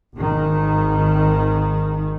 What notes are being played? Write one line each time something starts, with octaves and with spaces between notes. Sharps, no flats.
G#1 D#3